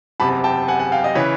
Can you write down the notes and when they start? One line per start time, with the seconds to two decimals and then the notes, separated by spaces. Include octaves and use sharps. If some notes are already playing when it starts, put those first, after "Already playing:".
0.20 F#1 E2 C3 A5 B5
0.44 G5 A5
0.68 F#5 G#5
0.79 F#5 G#5
0.92 F5 G5
1.04 D#5 F5
1.15 C#3 E3 B4 C#5